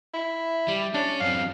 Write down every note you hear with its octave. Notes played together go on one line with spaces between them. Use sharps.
E4
G3
C#4 D4 C#5
F#2 C4 F5